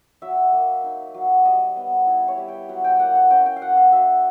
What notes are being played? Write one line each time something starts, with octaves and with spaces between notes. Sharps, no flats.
F#3 E5
A#3
D#4
F#3
G3 D#5
B3
E4
C#5
G3
G5
F#3 F#5
G5
A#3 F#5
F#5
C#4 G5
G5
F5
F#3 F#5
F5
F#3 E5